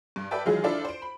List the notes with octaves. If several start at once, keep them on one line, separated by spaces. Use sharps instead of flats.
G2
A4 B4 D5 E5 G5 A5
D#3 E3 F#3 G#3 F4 G#4
D4 E4 F4 A4 C5 D5
C5 D7
B5